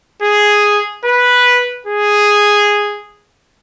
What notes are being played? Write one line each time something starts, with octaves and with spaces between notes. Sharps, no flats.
G#4
B4
G#4